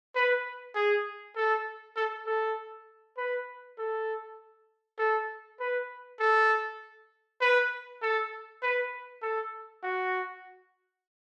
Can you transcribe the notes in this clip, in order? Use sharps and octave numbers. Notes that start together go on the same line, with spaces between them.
B4
G#4
A4
A4
A4
B4
A4
A4
B4
A4
B4
A4
B4
A4
F#4